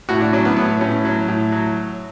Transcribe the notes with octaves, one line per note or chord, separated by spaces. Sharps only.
A2 F#4
D4
F#3 C#4
B3
A2 B3
A2 C#4
F#3
A2
F#3